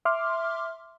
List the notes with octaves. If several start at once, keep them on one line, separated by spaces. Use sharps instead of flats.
E5 C6 D6 F6